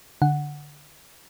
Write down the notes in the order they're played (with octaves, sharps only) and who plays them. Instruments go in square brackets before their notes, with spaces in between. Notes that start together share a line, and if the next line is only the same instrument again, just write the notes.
[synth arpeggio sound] D3 F#5